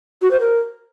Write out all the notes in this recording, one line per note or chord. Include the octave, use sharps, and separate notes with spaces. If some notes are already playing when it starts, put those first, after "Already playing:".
F#4
C5
A#4